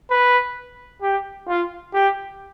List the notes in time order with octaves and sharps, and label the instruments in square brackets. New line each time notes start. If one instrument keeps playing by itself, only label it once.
[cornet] B4
G4
F4
G4